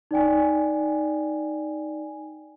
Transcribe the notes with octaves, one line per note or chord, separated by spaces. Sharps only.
D#4 D5 G5 G#5